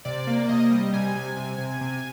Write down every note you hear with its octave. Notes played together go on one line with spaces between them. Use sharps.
C3 D5
A#3
C3 D#5
G3
C3 G#5
C3
C3
C3
C3